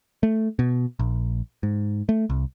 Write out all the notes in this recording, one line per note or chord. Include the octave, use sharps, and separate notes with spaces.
A3
B2
A#1
G#2
A3
C2